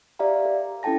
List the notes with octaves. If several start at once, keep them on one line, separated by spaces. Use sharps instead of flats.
G4 D5 E5 F5 A#5
A#4
C#4 E4 A4 G5 A5 A#6